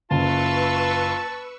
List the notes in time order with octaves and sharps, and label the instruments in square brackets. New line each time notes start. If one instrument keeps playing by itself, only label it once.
[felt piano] F#1 [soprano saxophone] F4 [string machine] B4 C#6 E6 [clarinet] A5